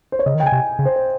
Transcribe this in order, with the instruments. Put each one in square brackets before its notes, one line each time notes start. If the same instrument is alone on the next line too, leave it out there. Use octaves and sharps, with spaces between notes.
[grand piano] C5
C#5
[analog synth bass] C#3 [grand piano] D#5
[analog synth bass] D#3
[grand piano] G5
[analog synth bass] C#3
[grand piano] G#5
[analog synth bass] C3
C#3
[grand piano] C5
C5